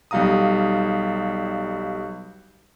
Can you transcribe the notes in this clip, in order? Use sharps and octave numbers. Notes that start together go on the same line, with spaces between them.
B1 G3 F5 A#5 D#6